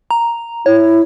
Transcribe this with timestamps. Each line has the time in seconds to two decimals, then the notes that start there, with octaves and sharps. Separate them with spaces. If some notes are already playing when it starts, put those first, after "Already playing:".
0.11 A#5
0.66 E4 C#5